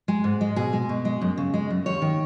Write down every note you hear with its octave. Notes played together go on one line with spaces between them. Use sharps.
G#3
G#2
G#3
B2 G#4
G#3
B2
G#3
F#2
C#3
G#3
F#2
D#2 C#5
D#3